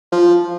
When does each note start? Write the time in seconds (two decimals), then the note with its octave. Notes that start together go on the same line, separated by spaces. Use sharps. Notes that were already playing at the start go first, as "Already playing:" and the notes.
0.12 F3